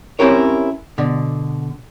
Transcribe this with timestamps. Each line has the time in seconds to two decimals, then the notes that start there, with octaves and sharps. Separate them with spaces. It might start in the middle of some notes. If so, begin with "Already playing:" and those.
0.19 C4 C#4 E4 G4 A#4 C#5
0.98 B2 D3